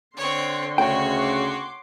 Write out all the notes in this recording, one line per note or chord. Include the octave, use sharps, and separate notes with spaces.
D3 C4 C#5 C6
D2 C#3 A3 F#4 C#5 G5
C6 D6